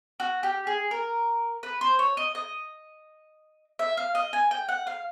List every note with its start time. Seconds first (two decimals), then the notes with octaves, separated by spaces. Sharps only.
0.20 F#4
0.43 G4
0.67 G#4
0.91 A#4
1.63 B4
1.81 C5
1.99 C#5
2.17 D#5
2.35 D#5
3.79 E5
3.97 F5
4.15 D#5
4.33 G#5
4.51 G5
4.69 F#5
4.87 F5